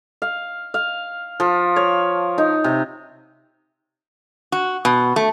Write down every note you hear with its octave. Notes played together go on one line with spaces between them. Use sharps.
F5
F5
F3
C#5
D#4
C3
F#4
B2
A3